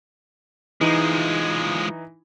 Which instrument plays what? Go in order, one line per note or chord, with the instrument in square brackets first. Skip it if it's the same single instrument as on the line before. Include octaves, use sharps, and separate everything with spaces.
[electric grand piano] E3 D#4 [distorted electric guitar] F3 G#3